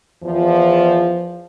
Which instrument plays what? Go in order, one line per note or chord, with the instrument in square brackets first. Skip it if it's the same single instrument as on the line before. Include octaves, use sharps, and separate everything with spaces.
[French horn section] E2 F3